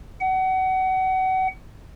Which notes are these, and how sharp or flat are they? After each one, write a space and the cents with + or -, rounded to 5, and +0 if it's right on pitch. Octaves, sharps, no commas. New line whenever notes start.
F#5 +30